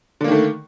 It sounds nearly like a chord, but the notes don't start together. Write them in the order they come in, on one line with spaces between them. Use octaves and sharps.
D3 A#3 D#3 A3